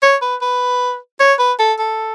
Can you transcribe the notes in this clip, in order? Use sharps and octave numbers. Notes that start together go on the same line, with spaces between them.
C#5
B4
B4
C#5
B4
A4
A4